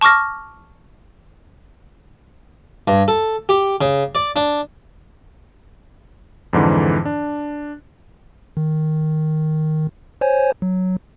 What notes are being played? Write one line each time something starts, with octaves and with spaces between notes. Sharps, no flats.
A5 C#6 D6 F6 A#6
G2
A4
G4
C#3
D5
D4
F2 G#2 D3 E3
D4
D#3
C5 C#5 G#5
F#3